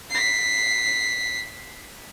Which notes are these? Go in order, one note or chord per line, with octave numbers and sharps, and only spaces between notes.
B6 C7